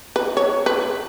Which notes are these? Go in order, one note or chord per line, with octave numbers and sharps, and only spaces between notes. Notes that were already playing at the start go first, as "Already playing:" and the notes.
B4
C#5
B4